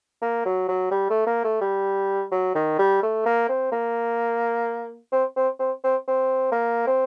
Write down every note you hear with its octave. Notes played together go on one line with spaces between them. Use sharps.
A#3
F#3
F#3
G3
A3
A#3
A3
G3
F#3
D#3
G3
A3
A#3
C4
A#3
C4
C4
C4
C4
C4
A#3
C4